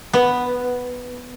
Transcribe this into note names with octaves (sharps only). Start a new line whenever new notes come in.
B3